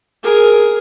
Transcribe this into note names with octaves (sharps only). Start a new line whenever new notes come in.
G#4 A#4